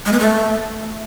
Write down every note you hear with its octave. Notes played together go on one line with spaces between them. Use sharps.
G#3
B3
A3